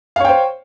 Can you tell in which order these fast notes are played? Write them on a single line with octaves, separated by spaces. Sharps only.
F5 C#5 G5 C5